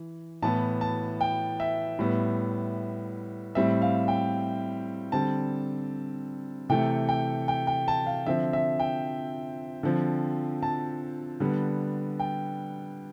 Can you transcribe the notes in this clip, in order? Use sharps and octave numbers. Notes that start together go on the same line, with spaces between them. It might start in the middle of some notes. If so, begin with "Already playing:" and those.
Already playing: E3
A2 E3 B3 A5
A5
G5
E5
A2 G3 B3
A2 G3 C4 E5
F5
G5
D3 G3 C4 A5
C3 E3 A3 G5
G5
G5
G5
A5
F5
D3 F3 C4 E5
E5
G5
D3 F3 C4
A5
D3 G3 B3
G5